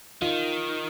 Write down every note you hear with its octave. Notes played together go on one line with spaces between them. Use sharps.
D#3 D#4 F4